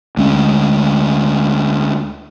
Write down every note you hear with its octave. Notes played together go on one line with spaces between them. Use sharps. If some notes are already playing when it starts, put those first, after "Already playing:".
D2 G#3 C#4